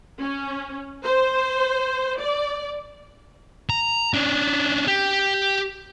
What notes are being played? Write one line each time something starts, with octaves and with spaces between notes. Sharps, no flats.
C#4
C5
D5
A#5
C#4 D4
G4